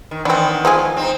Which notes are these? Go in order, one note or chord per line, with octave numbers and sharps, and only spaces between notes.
D#3
D#3 E3 B3 C4 D4
F3 G#3 G#4
C4 D#4